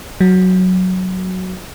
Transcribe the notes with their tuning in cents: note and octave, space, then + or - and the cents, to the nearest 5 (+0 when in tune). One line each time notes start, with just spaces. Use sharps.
F#3 +0